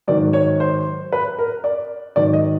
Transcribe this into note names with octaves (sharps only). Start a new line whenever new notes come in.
G#2 D#3 F#3 D5
C#5
C5
B4
A#4
D5
G#2 D#3 F#3 D5
D#5